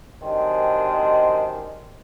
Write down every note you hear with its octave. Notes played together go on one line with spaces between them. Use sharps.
F#2 C3 D#3 G#3 D4 C5